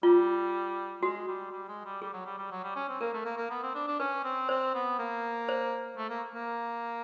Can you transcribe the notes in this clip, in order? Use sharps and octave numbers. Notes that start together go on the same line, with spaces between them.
G3 F4
G#3 F#4
G3
G3
G#3
G3
G3 G#4
F#3
G3
G3
F#3
G3
C#4
C4
A#3 A#4
A3
A#3
A#3
B3
C4
D4
D4
C#4 B4
C4
C4 C5
B3
A#3
C5
A3
A#3
A#3